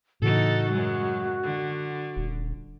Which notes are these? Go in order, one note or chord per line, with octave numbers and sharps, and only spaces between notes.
A2 C#3 E3 D#4 F#4 A4
F#2 F#3 G#3
D3
D#1